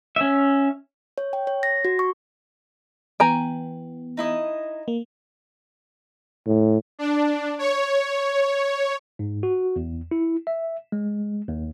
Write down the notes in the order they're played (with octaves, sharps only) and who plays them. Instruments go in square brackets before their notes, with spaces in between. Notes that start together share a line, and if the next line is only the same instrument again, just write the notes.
[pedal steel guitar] C#4 E5
[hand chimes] C#5
G5
C#5
A#6
F#4
C#6
[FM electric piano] E3 B3 [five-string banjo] G5 G#5 A#5
[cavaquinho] D#4 E4 D#5
[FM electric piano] A#3
[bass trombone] A2
[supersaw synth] D4
C#5
[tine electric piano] G#2
F#4
E2
E4
E5
G#3
D#2